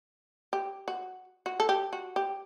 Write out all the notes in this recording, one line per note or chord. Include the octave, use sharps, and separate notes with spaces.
G4
F#4
F#4
A4
G4
F#4
G4